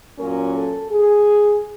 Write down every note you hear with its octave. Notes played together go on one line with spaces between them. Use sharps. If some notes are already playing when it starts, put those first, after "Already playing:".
A#2 F#3 A#3 C#4 A#4
A4
G#4